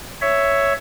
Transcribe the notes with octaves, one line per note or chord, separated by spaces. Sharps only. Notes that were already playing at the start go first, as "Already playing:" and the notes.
C#5 E5